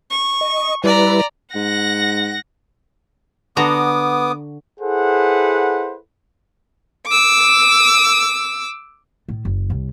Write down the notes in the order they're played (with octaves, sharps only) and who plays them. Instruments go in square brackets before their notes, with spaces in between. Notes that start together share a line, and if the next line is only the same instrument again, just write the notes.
[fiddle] C#6
[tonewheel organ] D#5
[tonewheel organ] G3 E4 B4 [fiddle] D5 A#5
[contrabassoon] G#2 [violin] F#5 A#6
[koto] D3 F#4 A#5 [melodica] B3 D6 D#6
[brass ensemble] E4 G#4 A4 B4 C5 F#5
[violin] D6 E6
[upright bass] A2
F#1
C2